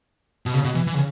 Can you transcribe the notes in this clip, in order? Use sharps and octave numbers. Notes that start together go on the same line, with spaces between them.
B2
C#3
B2
E3
E3
C#3